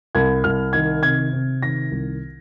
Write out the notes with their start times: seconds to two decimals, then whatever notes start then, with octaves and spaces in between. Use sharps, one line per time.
0.15 C2 G#6
0.44 C2 F6
0.73 D#3 G#6
1.03 C3 G#6
1.33 C3
1.62 D#3 A#6
1.91 C2